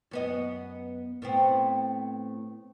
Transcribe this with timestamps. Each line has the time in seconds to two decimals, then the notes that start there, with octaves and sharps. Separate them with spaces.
0.11 F#2 B3 D#5
1.22 A2 B3 C4